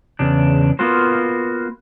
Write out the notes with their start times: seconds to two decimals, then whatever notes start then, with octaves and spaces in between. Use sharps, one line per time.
0.19 E2 C#3 D4
0.79 A#3 B3 F4 F#4 C5